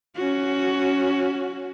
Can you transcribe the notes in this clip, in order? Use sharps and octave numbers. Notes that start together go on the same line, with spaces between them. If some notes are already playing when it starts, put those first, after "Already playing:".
C#4 F#4